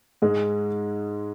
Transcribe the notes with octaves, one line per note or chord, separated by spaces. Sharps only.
G#2 G#3